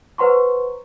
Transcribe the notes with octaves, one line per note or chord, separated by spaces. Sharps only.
B4 C5 F#5 A#5 C6 C#6